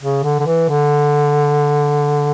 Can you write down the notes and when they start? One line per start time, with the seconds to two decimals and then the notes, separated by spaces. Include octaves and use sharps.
0.01 C#3
0.23 D3
0.40 D3
0.46 E3
0.69 D3